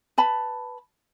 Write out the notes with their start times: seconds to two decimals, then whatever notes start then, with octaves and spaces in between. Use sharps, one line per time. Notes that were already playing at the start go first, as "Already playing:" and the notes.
0.18 B4 A5 B5